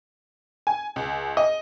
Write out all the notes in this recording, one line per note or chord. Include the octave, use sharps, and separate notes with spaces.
G#5
C#2
D#5